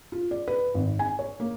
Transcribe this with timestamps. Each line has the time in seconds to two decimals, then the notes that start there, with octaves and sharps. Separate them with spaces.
0.12 F4
0.31 D5
0.48 B4
0.74 G#1
0.99 G#5
1.19 C#5
1.40 A#3